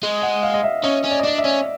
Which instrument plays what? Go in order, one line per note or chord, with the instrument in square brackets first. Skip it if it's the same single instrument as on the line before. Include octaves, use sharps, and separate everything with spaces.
[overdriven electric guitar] G#3
[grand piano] F#5
F5
D#5
E5
[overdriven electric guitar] C#4 [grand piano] D#5
[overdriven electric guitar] C#4
[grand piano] D5
D#5
[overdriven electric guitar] D4 [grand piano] D5
[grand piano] E5
[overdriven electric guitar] C#4